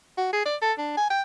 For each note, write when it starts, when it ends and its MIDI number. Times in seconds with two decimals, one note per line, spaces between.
0.18 0.28 66
0.33 0.43 68
0.45 0.56 74
0.62 0.73 69
0.78 0.96 62
0.97 1.10 80
1.10 1.22 79